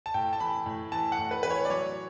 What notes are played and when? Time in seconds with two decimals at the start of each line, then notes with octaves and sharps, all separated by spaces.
0.06 A5
0.14 A2 G5
0.33 A5
0.40 E3 B5
0.66 A2
0.92 E3 A5
1.12 F#5
1.19 A2
1.31 B4
1.43 E3 B4
1.50 C#5
1.65 D5
1.70 F#3 C#5